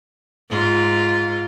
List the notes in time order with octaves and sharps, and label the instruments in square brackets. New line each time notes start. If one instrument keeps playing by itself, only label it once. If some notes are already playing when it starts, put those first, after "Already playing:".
[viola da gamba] G#2 F4